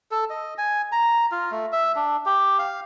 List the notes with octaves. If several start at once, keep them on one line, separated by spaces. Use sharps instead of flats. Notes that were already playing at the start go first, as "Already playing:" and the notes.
A4
D#5
G#5
A#5
F4
A3
E5
D4
G4
F5